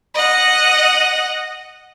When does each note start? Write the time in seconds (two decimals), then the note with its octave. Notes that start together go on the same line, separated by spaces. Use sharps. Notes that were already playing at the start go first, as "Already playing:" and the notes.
0.14 D#5 F#5